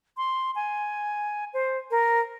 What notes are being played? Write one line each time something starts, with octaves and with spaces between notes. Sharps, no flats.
C6
G#5
C5
A#4